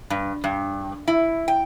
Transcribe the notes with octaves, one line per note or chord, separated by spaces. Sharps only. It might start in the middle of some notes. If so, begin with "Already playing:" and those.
G2
G2
E4
G5